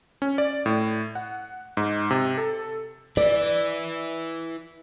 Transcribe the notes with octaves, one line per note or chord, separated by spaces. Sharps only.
C#4
D5
A2
F#5
G#2
C3
A4
E4 B4 D5